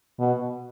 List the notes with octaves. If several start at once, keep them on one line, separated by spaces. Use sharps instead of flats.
B2